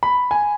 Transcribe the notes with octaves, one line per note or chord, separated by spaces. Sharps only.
B5
G#5